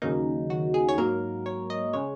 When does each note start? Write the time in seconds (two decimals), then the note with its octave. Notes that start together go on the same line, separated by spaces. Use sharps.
0.02 D#2 C#3 F#3 A#3 D#4
0.50 F#4
0.74 G#4
0.89 C#5
0.98 G#2 F#3 A#3 A#4
1.46 C#5
1.70 D#5
1.93 C#3 G#3 C#5